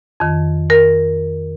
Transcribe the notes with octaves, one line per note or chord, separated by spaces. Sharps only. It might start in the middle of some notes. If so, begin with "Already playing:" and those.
F2 D#3
A#4